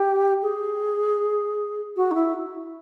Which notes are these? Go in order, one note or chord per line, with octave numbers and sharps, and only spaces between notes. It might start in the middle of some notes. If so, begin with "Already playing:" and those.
Already playing: G4
G#4
F#4
D#4
E4